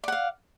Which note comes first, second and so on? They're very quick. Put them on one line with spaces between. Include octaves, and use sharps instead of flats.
D5 F#5 F5